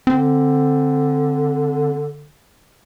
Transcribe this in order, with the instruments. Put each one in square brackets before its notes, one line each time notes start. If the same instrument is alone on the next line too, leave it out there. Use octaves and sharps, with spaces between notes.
[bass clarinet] D3 [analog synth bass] C4